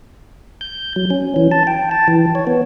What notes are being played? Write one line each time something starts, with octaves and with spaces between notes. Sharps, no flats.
G6
F#3
C#4
E3
A5
G5
A5
E3
C#5
B3